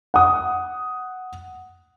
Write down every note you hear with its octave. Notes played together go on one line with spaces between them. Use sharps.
F#5 D#6